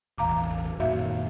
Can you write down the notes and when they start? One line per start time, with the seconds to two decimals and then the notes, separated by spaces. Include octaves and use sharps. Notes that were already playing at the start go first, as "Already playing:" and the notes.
0.18 E1 A1 F5 A#5 D6
0.80 F#2 A#2 D#3 F#4 E5 F5